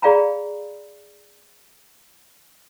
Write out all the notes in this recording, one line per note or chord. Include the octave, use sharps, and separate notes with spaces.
G#4 D5 F5 G5 A#5 B5